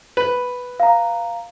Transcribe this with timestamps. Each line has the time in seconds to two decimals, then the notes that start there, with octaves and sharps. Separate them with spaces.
0.17 B4
0.80 F5 A#5